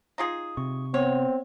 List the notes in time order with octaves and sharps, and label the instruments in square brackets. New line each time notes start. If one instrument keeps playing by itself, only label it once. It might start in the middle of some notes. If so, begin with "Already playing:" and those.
[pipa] D#4 F4 G#4
[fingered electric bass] C3 [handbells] C#6
[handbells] B3 [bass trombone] C4 [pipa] C#5